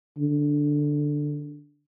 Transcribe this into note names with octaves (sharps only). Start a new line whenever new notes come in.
D3